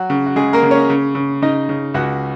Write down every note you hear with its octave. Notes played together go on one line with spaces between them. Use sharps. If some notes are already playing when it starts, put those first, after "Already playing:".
Already playing: F#3 F#4
C#3
F#4
C#3 G#3 G#4
A#3 A#4
C#3
C#4 C#5
C#3
C#3
C#3 D#4 D#5
C#3
C#2 F#4 F#5